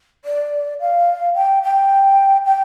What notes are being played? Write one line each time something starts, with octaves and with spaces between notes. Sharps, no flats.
D5
F5
G5
G5
G5